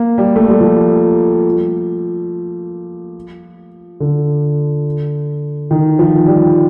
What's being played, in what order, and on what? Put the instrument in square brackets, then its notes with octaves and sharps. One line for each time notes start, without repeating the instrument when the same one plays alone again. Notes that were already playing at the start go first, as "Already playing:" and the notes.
Already playing: [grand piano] A#3
G3
A3
G3
F3
D3
D#3
F3
G3